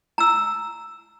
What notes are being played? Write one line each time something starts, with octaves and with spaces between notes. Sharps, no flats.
A#5 E6